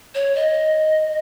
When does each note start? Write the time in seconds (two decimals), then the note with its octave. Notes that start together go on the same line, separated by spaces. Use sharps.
0.15 C#5
0.35 D#5